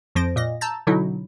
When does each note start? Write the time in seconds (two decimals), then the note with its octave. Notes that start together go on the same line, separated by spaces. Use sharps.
0.15 F2 F3 C5 A#6 D7
0.36 A#2 D#5 A#6
0.61 A5 A#5 E6 G6 A6
0.87 B2 D3 F#3 C#4 D#4 E4